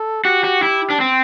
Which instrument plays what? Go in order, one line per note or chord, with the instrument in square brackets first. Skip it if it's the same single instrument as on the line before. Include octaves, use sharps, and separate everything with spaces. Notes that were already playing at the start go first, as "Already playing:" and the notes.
Already playing: [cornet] A4
[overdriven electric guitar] F#4 [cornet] G4
[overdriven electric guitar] F#4
E4
D4
C4